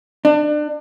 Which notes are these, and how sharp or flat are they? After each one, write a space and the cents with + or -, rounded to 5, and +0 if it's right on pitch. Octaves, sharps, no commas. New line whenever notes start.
D4 +30